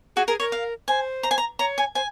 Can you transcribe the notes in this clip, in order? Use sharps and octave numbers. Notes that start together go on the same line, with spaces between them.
F#4 G#4
G#4 A#4
A#4 C#5
F5
C5 G#5
A#5
G#5
A#5
C#5 A#5
G#5
C5 G#5